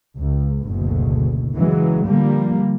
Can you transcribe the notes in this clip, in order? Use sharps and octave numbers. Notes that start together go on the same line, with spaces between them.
C#2
F#1 D2 B2
C#3 E3 F#3 G#3
D3 F3 G3 A#3